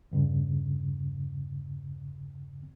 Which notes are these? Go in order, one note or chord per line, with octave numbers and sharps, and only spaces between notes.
E2 G2 C#3